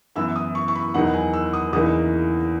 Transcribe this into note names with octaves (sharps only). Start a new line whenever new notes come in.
F#2 E3 B3 E4 E6
D#6
C#6
C#6
B5
E2 D#3 F#3 B3 D#4 F#5
G#5
E6
D#6
E2 C#3 E3 A#3 D#4 D#6